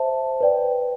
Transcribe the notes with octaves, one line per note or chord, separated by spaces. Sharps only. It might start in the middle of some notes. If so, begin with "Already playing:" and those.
Already playing: C5 E5 A5
B4 D5 G5